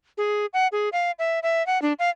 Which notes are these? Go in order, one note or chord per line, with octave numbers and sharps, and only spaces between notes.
G#4
F#5
G#4
F5
E5
E5
F#5
D4
F5